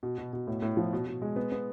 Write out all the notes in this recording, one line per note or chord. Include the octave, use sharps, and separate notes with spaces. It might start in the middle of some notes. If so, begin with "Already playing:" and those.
B2
B2
B2
A2
A2
F3
B2
B2
G#3
B3
B3